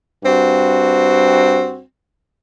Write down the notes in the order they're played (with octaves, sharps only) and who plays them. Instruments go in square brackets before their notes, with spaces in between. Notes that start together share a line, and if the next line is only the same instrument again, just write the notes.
[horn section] G2 C4 F#4